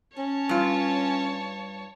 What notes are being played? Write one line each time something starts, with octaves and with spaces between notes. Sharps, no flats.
C#4 C#5 A5
G2 F4